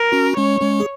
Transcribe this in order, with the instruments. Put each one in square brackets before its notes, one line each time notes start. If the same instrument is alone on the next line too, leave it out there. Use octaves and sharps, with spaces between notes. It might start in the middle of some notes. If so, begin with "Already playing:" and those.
Already playing: [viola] A#4
[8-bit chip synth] C#4 F#4
[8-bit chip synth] G#3 C#4 [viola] C#5
[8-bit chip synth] G#3 C#4
G#4